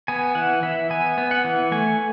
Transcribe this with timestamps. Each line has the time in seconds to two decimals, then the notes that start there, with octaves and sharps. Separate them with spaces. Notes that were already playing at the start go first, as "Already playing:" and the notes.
0.08 B3 G#5
0.35 E3 F#5
0.63 E3 E5
0.90 B3 G#5
1.18 B3
1.31 F#5
1.44 E3
1.72 A3 G#5